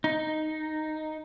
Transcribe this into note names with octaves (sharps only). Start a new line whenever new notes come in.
D#4